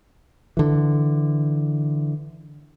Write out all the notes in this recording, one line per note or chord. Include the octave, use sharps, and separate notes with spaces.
D3 E3